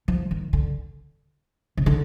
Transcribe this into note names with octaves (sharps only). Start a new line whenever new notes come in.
F3
D#3
D3
C#3
D3